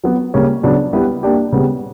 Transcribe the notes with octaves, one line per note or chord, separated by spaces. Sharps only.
F#3 B3 F#4
C#3 G3 A#3 C#4
C#3 F#3 B3 D4
G3 B3 E4 B4
A#3 D4 G4
C#3 G3 B3